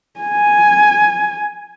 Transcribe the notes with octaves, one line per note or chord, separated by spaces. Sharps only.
G#5